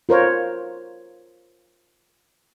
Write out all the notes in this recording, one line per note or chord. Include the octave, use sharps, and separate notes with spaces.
F4 A#4 C5 C#5